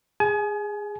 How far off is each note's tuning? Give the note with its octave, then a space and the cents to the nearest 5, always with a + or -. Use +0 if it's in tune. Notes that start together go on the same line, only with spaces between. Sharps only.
G#4 -15 G#5 +35